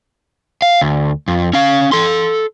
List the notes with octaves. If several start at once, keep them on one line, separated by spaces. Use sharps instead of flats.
F5
D2
F2
C#4 F5
A4 C6